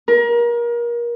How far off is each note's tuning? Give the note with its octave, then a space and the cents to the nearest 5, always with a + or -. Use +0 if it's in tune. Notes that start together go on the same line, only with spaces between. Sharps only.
A#4 +30